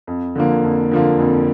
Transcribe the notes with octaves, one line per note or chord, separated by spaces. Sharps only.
F2
D3 F3 A#3
F2
D3 F3 A#3
F2